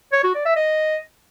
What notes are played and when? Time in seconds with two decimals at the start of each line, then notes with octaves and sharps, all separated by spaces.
0.13 C#5
0.24 F#4
0.35 D5
0.46 E5
0.56 D#5